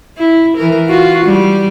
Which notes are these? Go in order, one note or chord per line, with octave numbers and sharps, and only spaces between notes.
E4
E3 A#4
F4 F#4
G3